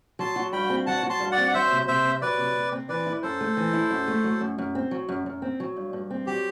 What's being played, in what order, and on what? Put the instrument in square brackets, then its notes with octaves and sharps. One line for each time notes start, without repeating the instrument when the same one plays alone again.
[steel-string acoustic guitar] F#3 [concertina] A5 C6
[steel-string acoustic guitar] F#4
[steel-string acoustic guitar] G2 [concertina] G5 B5
[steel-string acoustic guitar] C4
[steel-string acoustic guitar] F#3 [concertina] F#5 A5
[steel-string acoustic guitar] F#4
[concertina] A5 C6
[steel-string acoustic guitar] G2
[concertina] D5 F#5
[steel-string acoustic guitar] C4
[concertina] F#5
[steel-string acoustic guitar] F#3 [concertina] C5 E5
[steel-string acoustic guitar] C3
[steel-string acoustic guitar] C3 [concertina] C5 E5
[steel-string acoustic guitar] C4
[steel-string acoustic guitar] F#3 [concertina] B4 D5
[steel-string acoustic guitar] C3
C3
C4
[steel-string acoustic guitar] E3 [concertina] B4 D5
[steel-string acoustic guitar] E4
[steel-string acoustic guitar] F#2 [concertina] A4 C5
[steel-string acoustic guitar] A3
E3
E4
F#2
A3
F#3
F#2
F#2
C4
F#3
F#2
F#2
C4
F#3
G2
G2
C4
[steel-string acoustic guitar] F#3 [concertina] G4